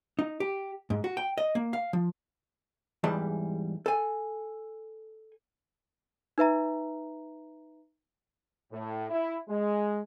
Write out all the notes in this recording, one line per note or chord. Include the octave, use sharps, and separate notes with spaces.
D#4
G4
G#2
F#4
G5
D#5
A#3
F5
F3
E2 G#2 E3 G3 A5
A4 G#5
D#4 B4 E5 A#5
A2
E4
G#3